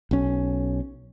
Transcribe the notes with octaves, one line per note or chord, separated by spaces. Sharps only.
B1 C#4